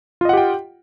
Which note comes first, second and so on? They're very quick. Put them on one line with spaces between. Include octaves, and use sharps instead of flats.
F4 D#5 F#5 G4 G5